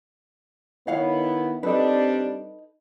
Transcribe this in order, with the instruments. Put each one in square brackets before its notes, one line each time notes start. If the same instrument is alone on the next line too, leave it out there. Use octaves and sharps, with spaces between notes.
[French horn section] D#3 B3 E4 [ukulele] C#5 F5 F#5
[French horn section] G3 C4 D4 [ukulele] D#4 A4 B4